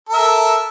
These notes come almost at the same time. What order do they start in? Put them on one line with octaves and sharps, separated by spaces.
A#4 E5 A4